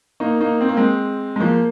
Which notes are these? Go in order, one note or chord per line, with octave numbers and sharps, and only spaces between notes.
A#3 D#4
A#3 D#4
C4
A#3
G#3 C4
G#3
F3 A#3